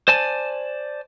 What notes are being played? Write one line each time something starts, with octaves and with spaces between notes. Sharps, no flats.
C5 D5 G#5 A5